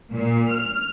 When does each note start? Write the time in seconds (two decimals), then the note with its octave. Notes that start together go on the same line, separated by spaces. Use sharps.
0.12 A#2
0.50 F6